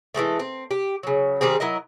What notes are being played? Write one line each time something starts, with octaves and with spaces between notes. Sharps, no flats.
E3 F#3 G#3 A3
C4
G4
C#3 F#3
D#3 G3 C4 G#4
F#3 E4 A#4 D#5